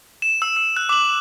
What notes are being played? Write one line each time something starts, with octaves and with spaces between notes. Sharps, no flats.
E7
E6
E6
F#6
D6 F#7